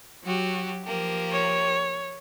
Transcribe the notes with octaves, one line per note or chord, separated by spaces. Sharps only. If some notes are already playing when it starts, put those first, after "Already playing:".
F#3 F#4 G4
F3 A#3 G4
C#5